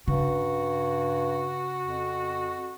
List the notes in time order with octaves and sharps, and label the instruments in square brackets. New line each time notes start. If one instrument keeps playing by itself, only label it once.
[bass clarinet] G2 [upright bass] C#3 [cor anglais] F#4
[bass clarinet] F2